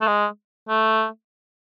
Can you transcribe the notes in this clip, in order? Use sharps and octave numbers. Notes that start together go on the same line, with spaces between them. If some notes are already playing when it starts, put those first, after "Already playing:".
A3
G#3
A3